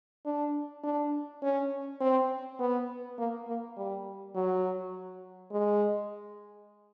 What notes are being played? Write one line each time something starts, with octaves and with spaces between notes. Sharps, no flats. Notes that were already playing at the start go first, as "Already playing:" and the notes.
D4
D4
C#4
C4
B3
A#3
A#3
G3
F#3
G#3